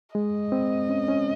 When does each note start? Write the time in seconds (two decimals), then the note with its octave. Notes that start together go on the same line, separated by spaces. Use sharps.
0.15 G#3 D#5
0.52 C4
0.89 C#4
1.08 C#4